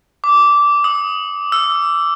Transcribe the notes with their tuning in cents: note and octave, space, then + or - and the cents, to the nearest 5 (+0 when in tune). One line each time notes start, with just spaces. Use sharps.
D6 -15
D#6 +20
E6 +15